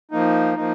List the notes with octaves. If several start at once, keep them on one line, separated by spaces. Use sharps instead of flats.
F3 A#3 D#4
F3 A#3 D#4